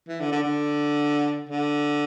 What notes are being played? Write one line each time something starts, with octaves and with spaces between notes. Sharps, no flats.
E3
D3
D3
D3
D3